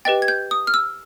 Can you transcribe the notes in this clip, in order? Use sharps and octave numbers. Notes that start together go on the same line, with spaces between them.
G4 B4 D#5 G5 A6
G#6
G6
D#6
F6
E6